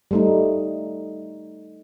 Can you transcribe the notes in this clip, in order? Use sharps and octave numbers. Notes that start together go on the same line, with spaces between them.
G3 A3 D#4